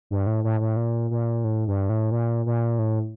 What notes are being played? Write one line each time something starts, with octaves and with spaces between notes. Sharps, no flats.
G2
A2
A2
A2
A#2
A#2
A2
G2
A2
A#2
A#2
A2